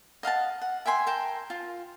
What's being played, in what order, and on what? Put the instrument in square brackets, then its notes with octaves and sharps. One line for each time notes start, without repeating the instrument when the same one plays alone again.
[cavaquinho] D#5 F5 F#5 A5
F#5
E5 G5 G#5 C6
A#4 G5 A5
F4